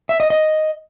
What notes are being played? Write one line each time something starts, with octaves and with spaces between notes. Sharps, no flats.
E5
D#5
D#5